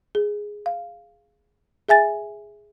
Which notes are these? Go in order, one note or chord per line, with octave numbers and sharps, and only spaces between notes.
G#4
F5
G#4 E5 G#5 A6